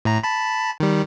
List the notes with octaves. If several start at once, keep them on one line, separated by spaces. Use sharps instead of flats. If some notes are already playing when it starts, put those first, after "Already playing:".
A2 A#5
A5 B5
D#3 G3